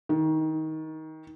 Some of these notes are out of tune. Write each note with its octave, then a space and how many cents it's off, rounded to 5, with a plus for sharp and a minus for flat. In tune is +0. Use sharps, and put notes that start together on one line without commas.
D#3 +20